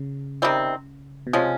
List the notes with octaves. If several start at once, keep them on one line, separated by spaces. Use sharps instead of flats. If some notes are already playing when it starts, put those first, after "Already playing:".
Already playing: C#3
C3 D#3 G3 C4
B2
C3 F3 G#3 C#4